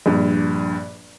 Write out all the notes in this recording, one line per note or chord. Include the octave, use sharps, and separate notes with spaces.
A#1 G2